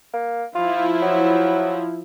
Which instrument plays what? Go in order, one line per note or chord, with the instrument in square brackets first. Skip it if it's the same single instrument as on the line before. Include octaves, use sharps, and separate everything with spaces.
[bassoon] A#3
[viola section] F3 E4 [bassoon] F4
[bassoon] F#3